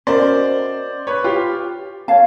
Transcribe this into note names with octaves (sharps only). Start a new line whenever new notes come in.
C#4 F#4 A#4 C5 D5 D#5
B4 C#5
F4 G4
C#5 F5 A5